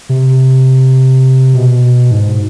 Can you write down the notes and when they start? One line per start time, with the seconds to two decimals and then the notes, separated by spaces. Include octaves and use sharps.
0.09 C3
1.54 B2
2.11 G#2